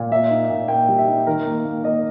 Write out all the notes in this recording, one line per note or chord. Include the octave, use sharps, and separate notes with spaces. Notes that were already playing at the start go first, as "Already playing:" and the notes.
Already playing: A#2
A#3 E5
D#4
A#2
A#3 G5
G3
E5
D#4
D#3 A#4
A#3
A#3
A#3 D#5